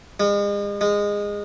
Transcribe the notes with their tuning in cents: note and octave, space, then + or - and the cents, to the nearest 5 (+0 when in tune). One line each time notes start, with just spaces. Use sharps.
G#3 -40
G#3 -20